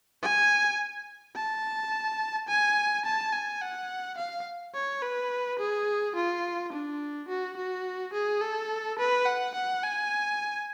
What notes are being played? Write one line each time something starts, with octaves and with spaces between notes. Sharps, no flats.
G#5
A5
G#5
A5
G#5
F#5
F5
C#5
B4
G#4
F4
D4
F#4
F#4
G#4
A4
B4
F#5
F#5
G#5